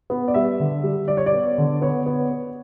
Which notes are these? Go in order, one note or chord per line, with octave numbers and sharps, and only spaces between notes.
B3
D5
G3 E5
D3
G3
G3 D5
C#5
D5
B3
D3
B3 C#5
B3
B3